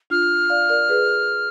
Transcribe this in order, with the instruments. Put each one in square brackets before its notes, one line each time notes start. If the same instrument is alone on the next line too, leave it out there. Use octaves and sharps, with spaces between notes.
[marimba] D4 F4 [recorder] F6
[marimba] D5 F5
A#4 D5
G#4 B4